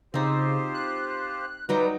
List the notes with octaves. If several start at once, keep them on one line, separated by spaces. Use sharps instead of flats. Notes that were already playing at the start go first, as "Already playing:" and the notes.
C#3 C4 D#4 F4 G4 C5
F#6
F#3 G3 D#4 F4 G4 B4 G5